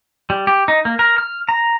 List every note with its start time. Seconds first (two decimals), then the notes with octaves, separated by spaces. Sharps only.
0.30 G3
0.47 G4
0.68 D#4
0.85 A#3
0.99 A#4
1.18 F6
1.49 A#5